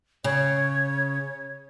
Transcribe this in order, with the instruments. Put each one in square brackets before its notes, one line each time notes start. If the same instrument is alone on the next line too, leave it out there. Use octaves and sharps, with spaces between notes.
[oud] C#3 [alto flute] C#5